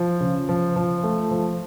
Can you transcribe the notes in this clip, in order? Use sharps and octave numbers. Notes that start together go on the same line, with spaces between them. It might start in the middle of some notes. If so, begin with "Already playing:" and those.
Already playing: F3
C#3
F3
F3
A3
F3